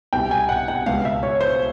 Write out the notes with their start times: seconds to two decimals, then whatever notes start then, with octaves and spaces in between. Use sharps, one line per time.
0.13 C2 B2 G5
0.31 G#5
0.49 F#5
0.68 F#5
0.86 C#2 B2 F5
1.05 E5
1.23 C#5
1.41 C5